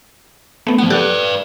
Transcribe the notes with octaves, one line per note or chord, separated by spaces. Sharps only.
A3 B3
F3 B3 F#5
G4 A4 B4 D5 F#6